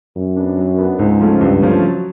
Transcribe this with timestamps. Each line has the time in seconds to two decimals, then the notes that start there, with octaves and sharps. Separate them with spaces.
0.16 F#2 F#3
0.36 B3 D4
0.57 F#3
0.78 B3 D4
0.99 C#2 G#2
1.20 C#3 F3 A3 C#4
1.41 C#2 G2
1.62 C#3 F3 A3 C#4
1.82 F#3